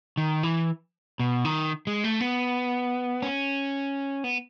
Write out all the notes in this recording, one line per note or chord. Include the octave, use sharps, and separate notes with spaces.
D#3
E3
B2
D#3
G#3
A3
B3
C#4
B3